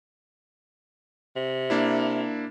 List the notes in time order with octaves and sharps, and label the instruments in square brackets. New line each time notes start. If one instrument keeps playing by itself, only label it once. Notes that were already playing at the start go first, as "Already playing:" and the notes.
[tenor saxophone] C3
[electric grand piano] A#3 D4 E4